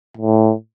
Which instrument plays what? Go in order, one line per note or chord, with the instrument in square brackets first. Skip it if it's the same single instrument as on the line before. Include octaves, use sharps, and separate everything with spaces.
[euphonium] A2